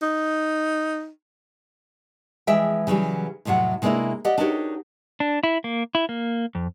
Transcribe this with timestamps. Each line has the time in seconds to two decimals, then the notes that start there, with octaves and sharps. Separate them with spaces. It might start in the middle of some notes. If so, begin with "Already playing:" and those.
0.02 D#4
2.47 E3 F3 G#3 E5 G5
2.87 C#3 E3 F#3 G3
3.45 F2 A2 C3 F#3 F#5
3.82 C3 G#3 A#3 D4 E4 A#4
4.25 G4 D5 D#5 F#5
4.38 D4 D#4 F#4 G4 A#4 C#5
5.20 D4
5.43 E4
5.64 A#3
5.95 E4
6.09 A#3
6.55 F2